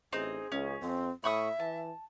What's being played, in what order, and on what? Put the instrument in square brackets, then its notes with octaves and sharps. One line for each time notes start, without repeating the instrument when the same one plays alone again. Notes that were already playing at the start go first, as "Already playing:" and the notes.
[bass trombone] A1 [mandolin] C4 D#4 [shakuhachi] G#4
[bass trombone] C#2 [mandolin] C#4
[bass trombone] F2 [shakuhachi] C4
[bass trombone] A2 [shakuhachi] E5 [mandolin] B5 C#6 D#6
[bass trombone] E3 [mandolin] A5